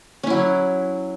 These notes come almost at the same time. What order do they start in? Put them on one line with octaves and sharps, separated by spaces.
C#4 E4 F#3